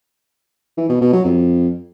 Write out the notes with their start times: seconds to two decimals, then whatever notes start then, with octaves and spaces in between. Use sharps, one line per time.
0.78 E3
0.89 B2
1.01 B2
1.13 F#3
1.24 F2